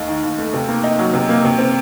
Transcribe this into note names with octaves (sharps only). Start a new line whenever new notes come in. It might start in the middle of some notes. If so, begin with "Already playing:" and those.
Already playing: D#2 A3 D#4
D#3
D#2
A3
C3
A#3
D#4
F#3
C3
A#3
C3
C4